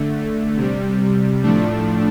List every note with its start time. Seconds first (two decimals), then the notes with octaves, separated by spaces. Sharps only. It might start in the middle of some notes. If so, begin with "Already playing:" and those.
Already playing: D3 A3
0.56 C3 G3
1.43 A2 F3 A3 D4